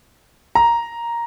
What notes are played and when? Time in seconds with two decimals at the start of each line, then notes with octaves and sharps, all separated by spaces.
0.55 A#5